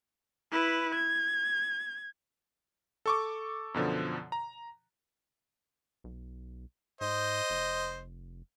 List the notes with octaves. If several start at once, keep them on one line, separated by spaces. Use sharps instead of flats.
E4 B4
G#6
A4 C#6 D6
F#2 B2 D3 F3
A#5
B1
G#2 C5 D#5
F1